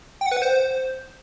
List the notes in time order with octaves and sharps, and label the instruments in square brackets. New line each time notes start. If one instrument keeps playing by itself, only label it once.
[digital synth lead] G5
F#5
B4
F#5
C5